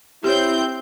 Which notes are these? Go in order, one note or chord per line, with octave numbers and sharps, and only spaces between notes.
C4 E4 G4 C#5 G6